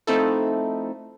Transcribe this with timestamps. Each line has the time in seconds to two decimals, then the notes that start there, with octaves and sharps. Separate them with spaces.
0.07 F3 A3 C4 D#4 E4 A4